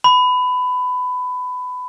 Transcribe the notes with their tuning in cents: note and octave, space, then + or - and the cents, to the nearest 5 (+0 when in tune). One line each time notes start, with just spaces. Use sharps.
B5 +20